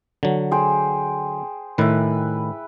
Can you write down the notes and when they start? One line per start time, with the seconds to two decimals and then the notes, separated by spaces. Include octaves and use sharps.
0.23 D3 F#3
0.51 G#4 C5 G5
1.78 A2 D#3 E4 B4